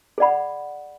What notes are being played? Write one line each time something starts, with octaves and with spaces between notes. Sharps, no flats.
G#4 D5 F#5 B5